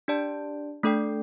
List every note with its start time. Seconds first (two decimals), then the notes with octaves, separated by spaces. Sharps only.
0.08 D4 G4 D5 A5
0.83 A3 D4 A4 D5 G5